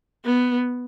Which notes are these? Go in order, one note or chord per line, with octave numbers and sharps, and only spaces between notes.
B3